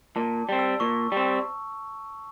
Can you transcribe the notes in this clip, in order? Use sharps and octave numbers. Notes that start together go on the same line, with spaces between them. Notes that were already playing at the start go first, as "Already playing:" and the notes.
A#2 A5
G3 C4
E6
A#2 C#6
G3 C4